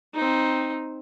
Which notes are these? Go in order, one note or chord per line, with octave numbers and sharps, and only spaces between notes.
C4 D#4